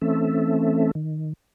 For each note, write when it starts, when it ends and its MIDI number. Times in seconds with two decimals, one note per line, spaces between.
0.02 0.91 52
0.02 0.91 57
0.02 0.91 60
0.02 0.91 61
0.02 0.91 69
0.02 0.91 76
0.95 1.33 51